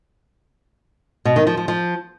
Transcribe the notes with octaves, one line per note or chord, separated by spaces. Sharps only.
B2
D#3
F3
F3
F3